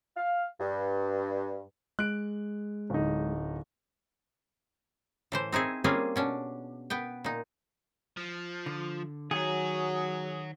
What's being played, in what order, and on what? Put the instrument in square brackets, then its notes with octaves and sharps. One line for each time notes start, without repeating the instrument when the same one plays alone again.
[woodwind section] F5
G2
[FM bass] G#3 [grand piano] F#6 D7
[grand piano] D1 D#4
[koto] A2 E3 C5
C4 D#4 E4 G#4
G3 A#3 C4 C#4 F4 G#4
B2 C#4 D4
B3 B4 G5
A#2 D#4
[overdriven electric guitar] F3
[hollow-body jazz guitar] D3
[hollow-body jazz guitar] D#3 [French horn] F#3 [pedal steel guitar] G#4 [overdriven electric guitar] C#5 F#5